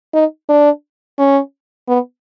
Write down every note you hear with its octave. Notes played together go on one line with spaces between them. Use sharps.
D#4
D4
C#4
B3